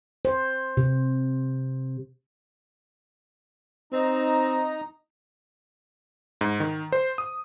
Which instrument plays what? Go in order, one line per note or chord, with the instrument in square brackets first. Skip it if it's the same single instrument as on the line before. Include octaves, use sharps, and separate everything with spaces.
[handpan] C5
C3
[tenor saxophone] C4 [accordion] D#4 A#5
[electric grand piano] G#2
D#3
C5
D#6